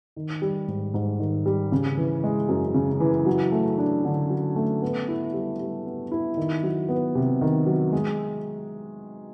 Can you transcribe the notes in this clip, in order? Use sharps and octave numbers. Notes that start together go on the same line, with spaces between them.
D#3
G3
G#2
G#2
D#3
G3
C#3
E3
G#3
F#2
C#3
E3
F#3
A3
D4
D3
F#3
A3
B3
E4
G3
G3
B3
E4
D#3
F#3
B3
C3
D#3
F#3
G#3